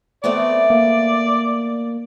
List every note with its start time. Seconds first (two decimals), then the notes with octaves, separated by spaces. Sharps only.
0.24 A3 B3 C4 D5
0.70 A#3